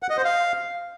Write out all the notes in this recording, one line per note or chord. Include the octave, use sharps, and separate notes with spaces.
F#5
D#5
C5
F5